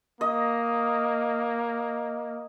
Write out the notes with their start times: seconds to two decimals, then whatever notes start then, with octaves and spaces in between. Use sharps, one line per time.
0.21 A#3 D#5